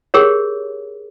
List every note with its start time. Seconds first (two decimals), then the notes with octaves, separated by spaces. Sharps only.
0.14 G4 G#4 A#4 C#5